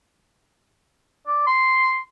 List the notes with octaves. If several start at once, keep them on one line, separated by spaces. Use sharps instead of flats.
D5
C6